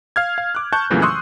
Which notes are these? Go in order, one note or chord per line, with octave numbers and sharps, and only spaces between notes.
F5 F6 G#6
F5
D6 F#6
A5 C#6 F#6 G6
F2 A#2 C#3 E3 F#3 A3
C6 C#6 D#6 E6 F#6